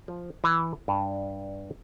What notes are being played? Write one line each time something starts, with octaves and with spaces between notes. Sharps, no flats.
F3
E3
G2